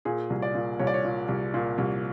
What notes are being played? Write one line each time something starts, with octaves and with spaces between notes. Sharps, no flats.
A#2 G#4
C2
D5
A#2
C2 C#5
D5
C#5
A#2
C2
A#2
C2